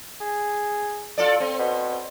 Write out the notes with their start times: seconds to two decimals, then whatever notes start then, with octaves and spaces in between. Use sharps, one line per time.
0.21 G#4
1.18 F4 A4 D5
1.40 C4
1.59 B2